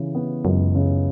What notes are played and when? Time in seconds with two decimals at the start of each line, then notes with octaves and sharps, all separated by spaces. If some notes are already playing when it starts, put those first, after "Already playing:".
Already playing: C#3 E3
0.15 B3
0.45 C#2 F#2
0.75 C#3